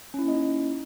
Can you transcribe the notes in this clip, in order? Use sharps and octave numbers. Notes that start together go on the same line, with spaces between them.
A#3 C#4 D#4 E4 D#5